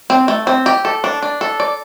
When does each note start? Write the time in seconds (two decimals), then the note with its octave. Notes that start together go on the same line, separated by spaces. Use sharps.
0.10 C4
0.28 A3
0.47 C4
0.66 G4
0.85 A4
1.04 D4
1.22 D4
1.41 A4
1.60 D5